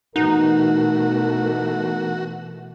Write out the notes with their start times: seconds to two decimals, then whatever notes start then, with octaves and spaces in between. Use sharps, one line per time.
0.16 B2 E3 A3 D#4 F#4 A#4